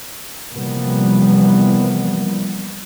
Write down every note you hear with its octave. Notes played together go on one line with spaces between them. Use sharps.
C3 E3 F3 G3 A#3 B3